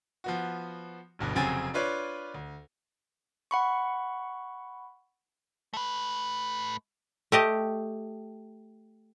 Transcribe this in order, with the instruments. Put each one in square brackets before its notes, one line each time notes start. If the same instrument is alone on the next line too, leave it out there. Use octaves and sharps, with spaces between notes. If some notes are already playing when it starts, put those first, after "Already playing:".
[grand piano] F3 B3 F#4
D1 G1 G2 B2
F1 C#3 F#3 C4 G#5 A6
D4 F4 B4 C#5 D5
D2
[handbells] F#5 B5 C#6
[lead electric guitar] A3 B4
[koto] A3 G4 D#5